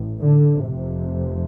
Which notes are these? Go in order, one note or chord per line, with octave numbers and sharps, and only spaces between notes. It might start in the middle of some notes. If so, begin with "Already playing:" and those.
Already playing: A1 A2
D3
F1 F2 C3